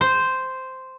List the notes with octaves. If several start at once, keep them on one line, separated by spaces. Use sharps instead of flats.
C5